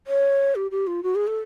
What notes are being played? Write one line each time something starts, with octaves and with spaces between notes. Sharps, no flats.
C#5
G4
G4
F4
F#4
G#4
A4